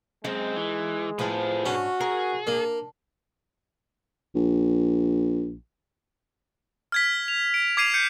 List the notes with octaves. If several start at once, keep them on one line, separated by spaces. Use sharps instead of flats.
F#2 G#3 C4 D#4
E3
A2 F3 G#4 B4
G#2 C#4 D4 F#4
G#4 A#4
A#3 D4
A#1
F6 G#6 B6
F7
D7
D6 G#6 C7 D#7 F7
G6 C#7 D#7